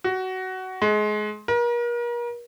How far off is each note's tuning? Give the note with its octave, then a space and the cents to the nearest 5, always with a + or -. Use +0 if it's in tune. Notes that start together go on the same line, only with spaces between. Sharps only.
F#4 +15
G#3 +25
A#4 +40